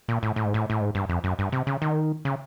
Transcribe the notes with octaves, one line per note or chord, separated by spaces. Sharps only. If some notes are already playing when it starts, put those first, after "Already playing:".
A#2
A2
A2
G#2
A2
A2
G#2
G2
F2
F#2
G2
C3
C#3
D#3
C#3